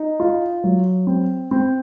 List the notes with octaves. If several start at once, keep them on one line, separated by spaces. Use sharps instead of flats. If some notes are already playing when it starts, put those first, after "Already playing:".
Already playing: D#4
F4
F#3
C4
C4